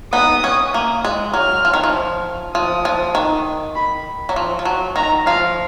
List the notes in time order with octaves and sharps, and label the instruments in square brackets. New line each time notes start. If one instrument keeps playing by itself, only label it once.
[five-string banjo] B3 D#4 [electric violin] D#6
[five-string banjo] C#4
A#3
G#3
[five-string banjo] F#3 [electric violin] F6
[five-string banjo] F3
D#3
F3
[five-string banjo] F3 [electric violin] D#6
[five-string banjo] F3
D#3
[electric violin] B5
[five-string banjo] F#3
F3
F3
F#3
[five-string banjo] D#3 [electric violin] A#5
[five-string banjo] F3 [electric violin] F5